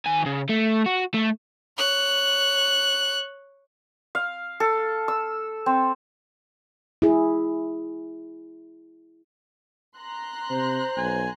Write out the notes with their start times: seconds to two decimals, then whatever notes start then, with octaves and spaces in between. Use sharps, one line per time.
0.06 D#3 G#5
0.26 C#3
0.49 A3
0.86 F#4
1.14 A3
1.78 C#5 F#6
4.15 F5
4.60 A4
5.08 E6
5.66 C4
7.02 E4 G#4
9.98 A#5 C6 F#6
10.50 C3 C5
10.97 B1 G#5